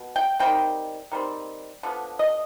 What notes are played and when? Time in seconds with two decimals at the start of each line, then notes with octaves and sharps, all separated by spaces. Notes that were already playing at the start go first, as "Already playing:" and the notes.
Already playing: B2
0.16 G5
0.39 D#3 G3 C4 G5
1.12 D#3 G3 C4
1.83 D3 F3 B3
2.19 D#5